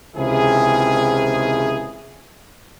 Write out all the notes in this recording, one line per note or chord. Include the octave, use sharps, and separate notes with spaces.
C#2 C3 D#3 F3 E4 G#4